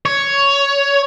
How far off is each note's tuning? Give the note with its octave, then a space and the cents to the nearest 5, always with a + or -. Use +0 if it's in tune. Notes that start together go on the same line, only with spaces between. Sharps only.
C#5 +10